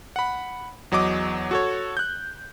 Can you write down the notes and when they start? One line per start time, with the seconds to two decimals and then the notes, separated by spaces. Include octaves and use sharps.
0.16 F#5 B5
0.91 E2 F#3 D#5 D6
1.51 F#4 A4 C#5
1.97 F#6 G6